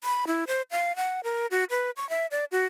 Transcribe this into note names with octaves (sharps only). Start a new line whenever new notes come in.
B5
E4
C5
F5
F#5
A#4
F#4
B4
C#6
E5
D5
F#4